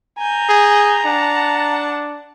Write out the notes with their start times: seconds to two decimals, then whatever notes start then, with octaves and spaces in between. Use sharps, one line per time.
0.18 G#5 A#5 G6
0.49 G#4
1.06 D4 F#5 A5